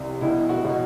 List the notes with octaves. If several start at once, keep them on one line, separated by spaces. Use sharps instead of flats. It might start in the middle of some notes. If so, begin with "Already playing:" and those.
Already playing: C2 C3
B2 E4
F#4
B2